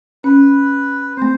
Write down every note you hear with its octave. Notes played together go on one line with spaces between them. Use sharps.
C#4 B4
A3 C4 C5